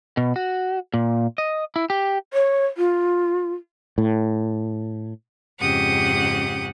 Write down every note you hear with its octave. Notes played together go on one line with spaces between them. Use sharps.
B2
F#4
A#2
D#5
E4
G4
C#5
F4
A2
F2 G#2 C#3 G4 F#5 D#6